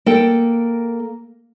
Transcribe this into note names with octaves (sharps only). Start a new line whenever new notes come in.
A#3 A4 G5